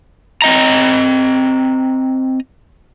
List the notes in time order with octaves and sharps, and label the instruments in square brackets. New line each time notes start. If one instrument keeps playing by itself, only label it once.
[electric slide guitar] C4 D#5 A#5